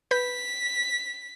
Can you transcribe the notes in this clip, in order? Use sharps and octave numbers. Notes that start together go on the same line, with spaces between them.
B4 B5 G6 B6